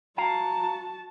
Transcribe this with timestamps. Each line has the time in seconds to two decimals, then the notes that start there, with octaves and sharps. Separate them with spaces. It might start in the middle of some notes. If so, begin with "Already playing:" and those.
0.17 F#4 F5 A5 A#5